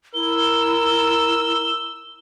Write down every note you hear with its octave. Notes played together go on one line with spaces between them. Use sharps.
E4 A#4 E6 G7